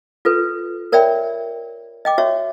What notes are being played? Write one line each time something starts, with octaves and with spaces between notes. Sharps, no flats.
F4 A4 B4
A#4 C#5 D5 E5 G5 B5
D#5 G5 D6
F#4 C#5 E5 C#6